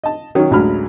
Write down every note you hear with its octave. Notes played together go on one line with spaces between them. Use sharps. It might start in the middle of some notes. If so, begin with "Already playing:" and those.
D#5 A5
D#3 F#3 C#4
A1 D2 F#3 G#3 B5 F6